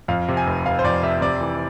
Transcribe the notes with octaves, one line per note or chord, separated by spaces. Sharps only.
F2 F5
C3
G#5
F1
F1 F5
C5
F2 D5
C3 E5
C3 D5
E3